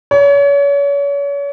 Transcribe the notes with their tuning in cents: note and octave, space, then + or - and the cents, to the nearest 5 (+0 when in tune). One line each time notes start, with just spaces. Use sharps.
C#5 +35